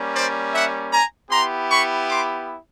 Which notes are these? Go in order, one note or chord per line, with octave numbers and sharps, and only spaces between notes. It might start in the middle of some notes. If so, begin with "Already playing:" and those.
Already playing: G3 A#3 C#4
C5 D5
E5 F#5
G#5 A#5
B3 E4 G4 A#5 C6
B5 C#6
C6 D6